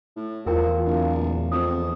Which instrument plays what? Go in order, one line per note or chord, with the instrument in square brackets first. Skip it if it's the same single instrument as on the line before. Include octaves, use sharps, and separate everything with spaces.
[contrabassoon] A2
[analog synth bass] E2 [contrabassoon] F3 [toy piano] E4 A#4 G5 [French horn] F4
[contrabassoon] D1
[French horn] A#2
[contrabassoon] F2 [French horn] C4 [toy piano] D#6